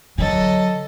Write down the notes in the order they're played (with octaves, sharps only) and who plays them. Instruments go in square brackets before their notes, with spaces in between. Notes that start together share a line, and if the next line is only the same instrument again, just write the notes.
[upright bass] D3 [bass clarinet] F#3 [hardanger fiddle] A4 D#5